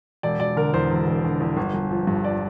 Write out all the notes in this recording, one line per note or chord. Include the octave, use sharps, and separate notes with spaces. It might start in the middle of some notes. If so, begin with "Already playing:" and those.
E1 D5
E1 D5
D3 A#4
E2 C5
E1
E1
D3
E2
G1
G1
F3
G2
D5